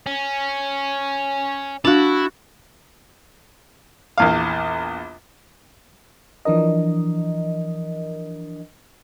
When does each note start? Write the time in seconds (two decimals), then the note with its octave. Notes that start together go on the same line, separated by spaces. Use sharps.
0.06 C#4
1.85 D4 E4 F#4 F5 A5
4.18 A#1 E2 F5
6.45 E3 F3 D4 A#4 D#5